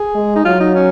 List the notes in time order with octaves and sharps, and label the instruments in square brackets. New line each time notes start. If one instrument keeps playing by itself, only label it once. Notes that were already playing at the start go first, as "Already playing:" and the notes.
Already playing: [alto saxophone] G#4
[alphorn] G#3
[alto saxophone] D#4
[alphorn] F#3 [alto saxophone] F4
[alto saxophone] D#4
C#4